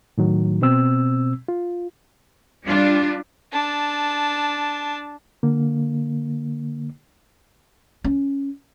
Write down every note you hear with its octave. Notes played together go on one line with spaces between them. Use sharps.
A2 D#3 F#3
B2 C4 E6
F4
G3 D4 F4
D4 A5
D3 A#3
C#4